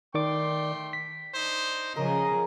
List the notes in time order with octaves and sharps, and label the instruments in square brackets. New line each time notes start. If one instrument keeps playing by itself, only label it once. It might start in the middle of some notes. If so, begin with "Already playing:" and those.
[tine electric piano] D#3 D5 D6 [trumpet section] A3 G5 C6
[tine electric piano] B6
[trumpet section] D4 D#4 C5
[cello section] C#3 F3 G#4 [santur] A#4 [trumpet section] D#5